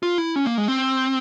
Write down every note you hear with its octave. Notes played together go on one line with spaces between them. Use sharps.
F4
E4
C#4
A#3
G#3
C4